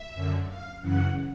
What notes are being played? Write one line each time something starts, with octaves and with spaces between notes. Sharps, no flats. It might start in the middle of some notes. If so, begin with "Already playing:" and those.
Already playing: E5
F#2 D3
F5
F#2 C#3 E3 F#5